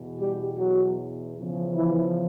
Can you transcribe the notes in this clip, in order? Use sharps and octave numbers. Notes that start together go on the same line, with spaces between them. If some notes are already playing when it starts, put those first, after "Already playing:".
Already playing: E2 B2
G3 G4
F#3 F#4
E2 C#3 F3
E3 E4